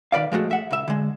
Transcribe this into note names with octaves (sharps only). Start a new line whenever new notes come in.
D#3 B4 D5 F5
F3 G#3 A3 F#4
E5 F#5
C#2 E5
D3 G#3